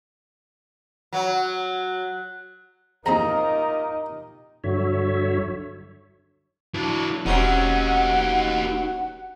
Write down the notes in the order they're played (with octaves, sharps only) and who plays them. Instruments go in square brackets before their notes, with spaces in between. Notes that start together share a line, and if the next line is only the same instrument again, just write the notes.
[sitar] F#3
[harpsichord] A#1 C4 G#4 [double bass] D#4 [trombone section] F4 G4 A#4 [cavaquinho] A#5
[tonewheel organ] G2 D3 F#3 C#5 E5
[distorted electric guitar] F#3 E4 [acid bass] D4
[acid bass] E1 [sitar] F#3 C4 C#4 [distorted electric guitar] D#4 G4 [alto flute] F#5